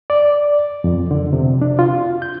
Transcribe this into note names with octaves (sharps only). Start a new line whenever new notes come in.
D5
F2
D3
C3
D4
F4
G6